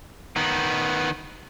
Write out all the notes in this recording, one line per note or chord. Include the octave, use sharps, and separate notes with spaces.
D#3 B3